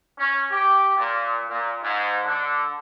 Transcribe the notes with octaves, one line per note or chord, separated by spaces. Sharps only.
C#4
G4
A#2
A#2
G#2
D3